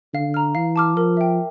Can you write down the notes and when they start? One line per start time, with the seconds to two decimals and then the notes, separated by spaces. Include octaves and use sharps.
0.14 D3 F5
0.34 A#5 F6
0.55 E3 F5
0.76 A5 D6 F6
0.96 F3 A#4
1.17 E5 G5